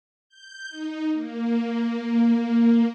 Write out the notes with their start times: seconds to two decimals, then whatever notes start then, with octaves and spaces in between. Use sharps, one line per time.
0.29 G6
0.70 D#4
1.12 A#3